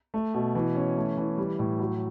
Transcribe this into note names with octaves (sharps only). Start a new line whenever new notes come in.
A3
B2
E3
C#4
A3
E3
G3
A2
F#3